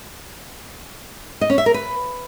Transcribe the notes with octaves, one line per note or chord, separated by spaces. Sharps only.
D#5
C#4
E5
A#4
B4